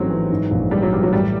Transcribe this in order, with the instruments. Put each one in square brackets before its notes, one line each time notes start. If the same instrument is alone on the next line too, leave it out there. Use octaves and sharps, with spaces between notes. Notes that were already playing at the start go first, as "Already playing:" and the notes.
Already playing: [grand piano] A1 G#2 F3 A3 [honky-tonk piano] F#3 C4
[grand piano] E3
G#2
A#1
[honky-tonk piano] G3 [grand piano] G#3
[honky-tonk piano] F#3
[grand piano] E3 [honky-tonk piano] G3
[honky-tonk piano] F#3
[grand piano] A2 [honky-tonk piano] G3